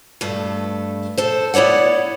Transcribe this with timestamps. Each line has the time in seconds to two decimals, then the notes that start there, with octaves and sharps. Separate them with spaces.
0.21 G2 A3
1.17 A4 C5
1.54 B3 E4 C#5 D5 F#5